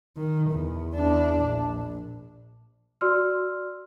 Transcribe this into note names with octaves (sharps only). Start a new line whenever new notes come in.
D#3
E2
E2 D4
A#1
F#4 D5 C6 E6 F6